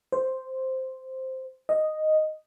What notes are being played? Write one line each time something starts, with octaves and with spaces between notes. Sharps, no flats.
C5
D#5